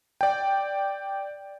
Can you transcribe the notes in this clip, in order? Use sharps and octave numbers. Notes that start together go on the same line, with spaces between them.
D5 G5